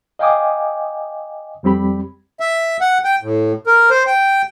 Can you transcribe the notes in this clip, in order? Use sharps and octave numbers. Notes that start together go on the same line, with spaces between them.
D#5 F5 G5 G#5 D6 D#6
F2 G3 C4 G4 B5
E5
F#5
G5
A2
A#4
C5
G5